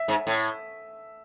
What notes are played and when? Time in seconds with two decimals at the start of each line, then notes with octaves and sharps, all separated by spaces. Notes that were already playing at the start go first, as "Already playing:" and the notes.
Already playing: E5
0.08 G#2
0.27 A2